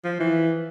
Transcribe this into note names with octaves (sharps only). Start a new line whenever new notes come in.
F3
E3